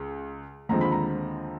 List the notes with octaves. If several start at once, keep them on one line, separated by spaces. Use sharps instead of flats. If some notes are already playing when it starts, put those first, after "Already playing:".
Already playing: C#2
D#2 D3 F3 G#3 C4 A#5
B5
A#5